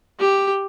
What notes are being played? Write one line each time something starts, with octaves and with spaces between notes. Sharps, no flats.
G4